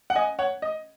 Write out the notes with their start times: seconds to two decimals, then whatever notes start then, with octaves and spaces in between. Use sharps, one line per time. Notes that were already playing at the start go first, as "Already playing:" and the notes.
0.10 F#5
0.15 D#5 G#5
0.39 C#5 F#5
0.62 D#5